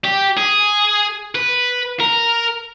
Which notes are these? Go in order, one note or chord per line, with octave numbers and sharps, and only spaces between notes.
G4
G#4
B4
A#4